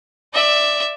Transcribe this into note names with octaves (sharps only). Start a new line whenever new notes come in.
D5 E5